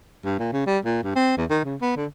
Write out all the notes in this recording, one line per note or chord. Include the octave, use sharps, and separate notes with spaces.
G2
A#2
C#3
G3
A#2
G2
C4
E2
D#3
C#3
B3
D3